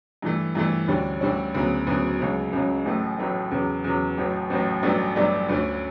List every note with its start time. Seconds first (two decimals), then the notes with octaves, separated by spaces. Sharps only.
0.22 G2 E3 A3
0.55 G2 E3 A3
0.88 D2 D3 G3 C#4
1.21 D2 D3 G3 C#4
1.55 D2 C#3 F#3 B3
1.87 D2 C#3 F#3 B3
2.20 C#2 C#3 F#3
2.53 C#2 C#3 F#3
2.85 A1 A2 F#3 A3
3.19 A1 A2 F#3 A3
3.51 E2 C#3 F#3
3.84 E2 C#3 F#3
4.18 A1 A2 F#3
4.50 A1 A2 F#3
4.83 A1 G2 F#3 A3 D4
5.16 A1 G2 F#3 A3 D4
5.49 D2 D3 A3 C#4